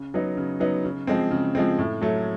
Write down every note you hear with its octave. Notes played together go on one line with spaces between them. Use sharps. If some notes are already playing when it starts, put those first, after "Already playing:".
Already playing: C#3
F#3 B3 D#4
C#3
F#3 B3 D#4
C#3
F3 G#3 C4
C#3
F3 G#3 C4
A2
F#3 A3